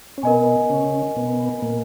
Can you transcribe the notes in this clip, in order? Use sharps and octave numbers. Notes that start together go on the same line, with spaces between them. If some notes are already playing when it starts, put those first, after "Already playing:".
C#4
B2 B3 A#4 D#5 G#5
C#3 C#4
B2 B3
A#2 A#3